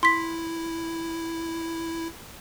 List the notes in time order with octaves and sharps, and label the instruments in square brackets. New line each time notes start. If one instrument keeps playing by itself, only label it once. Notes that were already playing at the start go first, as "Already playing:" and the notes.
[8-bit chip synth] E4 [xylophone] C6 B6